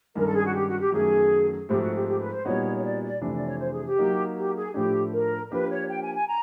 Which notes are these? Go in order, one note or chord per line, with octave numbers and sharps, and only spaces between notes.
G2 D#3 G#3 C#4 A#4
A4
G#4
F#4
G4
F#4
G4
F#2 D#3 F#3 A3 G#4
G#2 F3 A3 C4 G4
F#4
G4
G4
B4
C5
A#2 G3 B3 D#4 F#4 C#5
C#5
D5
D5
F2 C3 E3 A3 D4
D5
C#5
C5
G#4
G4
F#3 A#3 D#4
G4
G#4
A2 F3 A3 D4 G4
A#4
F3 A#3 D4 G4 A#4 B4
C#5
G5
G#5
G#5
A#5